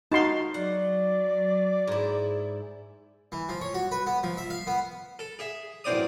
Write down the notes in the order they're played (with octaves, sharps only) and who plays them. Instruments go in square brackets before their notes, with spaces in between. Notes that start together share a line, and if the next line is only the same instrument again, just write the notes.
[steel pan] D#4 F#4 C6 [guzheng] F5 A5
[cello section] F#3 [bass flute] D5 [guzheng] F#5
[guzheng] G#2 E4
[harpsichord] E3
F3
C#5
F#4
B4
B3
F3
E5
F5
B3
A4
G#4 E5
A1 F#2 C4 C5 D5 D#6